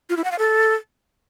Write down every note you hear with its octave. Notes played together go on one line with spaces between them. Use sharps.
F4
E4
F#5
F5
A4